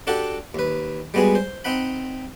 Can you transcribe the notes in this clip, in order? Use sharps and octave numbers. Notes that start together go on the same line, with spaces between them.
D4 F#4 G4 A4 F#5
D#2 B4
G3 G#3 B3 F#4 G#4
C5
C4 D#4 F#5 B5